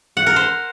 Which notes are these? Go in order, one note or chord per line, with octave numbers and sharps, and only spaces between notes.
F#5
A#4
C5